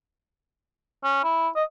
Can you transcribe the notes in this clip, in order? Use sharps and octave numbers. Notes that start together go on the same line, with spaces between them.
C#4
E4
D#5